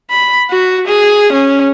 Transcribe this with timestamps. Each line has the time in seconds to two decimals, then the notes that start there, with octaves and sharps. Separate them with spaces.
0.11 B5
0.50 F#4
0.88 G#4
1.33 C#4